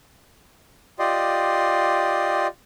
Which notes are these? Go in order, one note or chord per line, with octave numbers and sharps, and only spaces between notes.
F4 G4 D5 D#5 C6